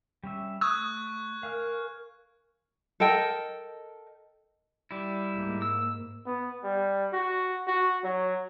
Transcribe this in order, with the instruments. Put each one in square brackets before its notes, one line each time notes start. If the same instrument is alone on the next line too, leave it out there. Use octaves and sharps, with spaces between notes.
[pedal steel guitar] G3 C#4 E5
[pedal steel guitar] A3 [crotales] C#6 F#6 G#6 [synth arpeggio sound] D#6
[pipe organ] A#4 [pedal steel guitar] F5 G#5 F6
[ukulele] A4 A#4 D#5 G5
[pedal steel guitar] G3 E4
[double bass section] G#2 A#3
[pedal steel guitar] E6
[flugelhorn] B3
G3
F#4
F#4
F#3